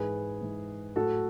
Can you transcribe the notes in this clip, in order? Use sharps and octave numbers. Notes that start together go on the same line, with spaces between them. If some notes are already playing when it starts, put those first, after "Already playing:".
Already playing: G#2 E3 G#4 B4
G#2 E3
A2 F#3 F#4 A4